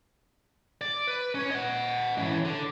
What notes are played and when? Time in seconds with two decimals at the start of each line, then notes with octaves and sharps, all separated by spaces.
0.81 D5
1.08 B4
1.35 C#4 C#5
1.51 D#5 F#5
2.18 E3 C#4
2.45 D3